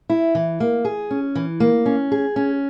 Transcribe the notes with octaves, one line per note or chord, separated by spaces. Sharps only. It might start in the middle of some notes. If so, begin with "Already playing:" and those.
E4
E3
A#3
G#4
C#4
E3
A#3
C#4
G#4
C#4